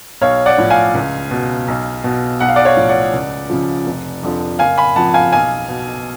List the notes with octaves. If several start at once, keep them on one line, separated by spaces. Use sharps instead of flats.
B1 C#5 F5
D5 F#5
A2 F3
F5 G#5
C#2
B2
B1
B2
B1 F#5
F5
D5 F#5
C#5 F5
A2 F3
D5 F#5
C#2
C#3 F3
F1
F2 D3 F3
F#1 F5 G#5
G#5 B5
F2 F3 F#5 A5
F5 G#5
B1 F5 G#5
B2